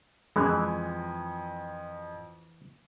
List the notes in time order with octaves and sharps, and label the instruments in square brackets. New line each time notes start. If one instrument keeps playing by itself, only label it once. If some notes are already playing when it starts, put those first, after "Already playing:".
[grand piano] F2 [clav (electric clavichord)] E3 [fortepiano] G#3